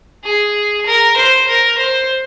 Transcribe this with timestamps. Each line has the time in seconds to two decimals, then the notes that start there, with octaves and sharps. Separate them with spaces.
0.24 G#4
0.86 A#4
1.17 C5
1.48 A#4
1.78 C5